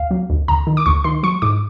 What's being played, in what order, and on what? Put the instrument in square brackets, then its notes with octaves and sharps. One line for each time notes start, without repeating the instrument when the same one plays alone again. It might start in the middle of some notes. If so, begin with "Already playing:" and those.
Already playing: [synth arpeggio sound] D2 F5
F#3
D2
D2 A#5
D#3
D6
D2 C#6
D#3 C6
F#3 C#6
G#2 D6